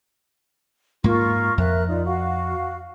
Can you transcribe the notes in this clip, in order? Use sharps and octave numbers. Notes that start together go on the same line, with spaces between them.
G#2 A#3 F4 A#4 C#6
F2 A#4 E5 F#6
D#4 F4 D5
F#4 F5